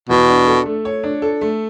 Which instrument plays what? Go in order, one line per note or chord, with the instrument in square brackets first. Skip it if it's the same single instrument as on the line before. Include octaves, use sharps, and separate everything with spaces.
[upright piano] E2 [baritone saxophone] B2
[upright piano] D4
A4
A3
C#5
D4
A4
A3